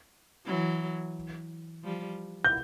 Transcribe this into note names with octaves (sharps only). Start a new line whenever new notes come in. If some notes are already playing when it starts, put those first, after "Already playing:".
E3 F#3
F3 G3
G6